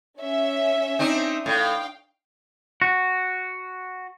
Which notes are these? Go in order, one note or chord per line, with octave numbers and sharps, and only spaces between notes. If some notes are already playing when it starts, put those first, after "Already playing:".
C#4 E5
C4 D4 D#4
A2 F5 G5
F#4